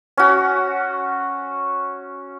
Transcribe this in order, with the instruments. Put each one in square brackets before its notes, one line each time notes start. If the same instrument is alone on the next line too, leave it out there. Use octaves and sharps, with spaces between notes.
[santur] C#4 F#4